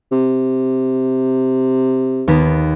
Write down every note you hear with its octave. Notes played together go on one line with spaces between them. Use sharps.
C3
D#2 B3 B6